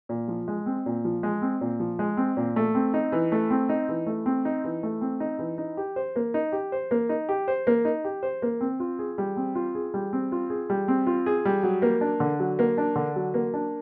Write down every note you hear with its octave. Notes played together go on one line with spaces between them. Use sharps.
A#2
F3
G#3
C4
A#2
F3
G#3
C4
A#2
F3
G#3
C4
A#2
A3
C4
D#4
E3
A3
C4
D#4
E3
A3
C4
D#4
E3
A3
C4
D#4
E3
D#4
G4
C5
A#3
D#4
G4
C5
A#3
D#4
G4
C5
A#3
D#4
G4
C5
A#3
C4
F4
G#4
G3
C4
F4
G#4
G3
C4
F4
G#4
G3
C4
F4
G#4
G3
F#3
A#3
D4
D3
F#3
A#3
D4
D3
F#3
A#3
D4